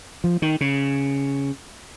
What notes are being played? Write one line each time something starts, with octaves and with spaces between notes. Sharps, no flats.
F3
D#3
C#3